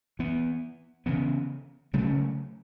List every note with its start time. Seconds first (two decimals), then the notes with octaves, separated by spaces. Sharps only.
0.19 E3 B3
1.06 C#3 E3 B3
1.93 C#3 F#3 A3 C#4